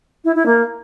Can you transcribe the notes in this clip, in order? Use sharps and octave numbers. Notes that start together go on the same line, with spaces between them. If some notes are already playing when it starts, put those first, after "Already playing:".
E4
E4
A#3